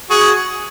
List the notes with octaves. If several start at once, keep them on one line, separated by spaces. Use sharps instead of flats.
F#4 G#4